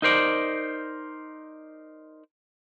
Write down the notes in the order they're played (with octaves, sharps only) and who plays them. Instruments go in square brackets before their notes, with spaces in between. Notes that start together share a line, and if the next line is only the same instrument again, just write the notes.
[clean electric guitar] D#4 A#4 C5 D5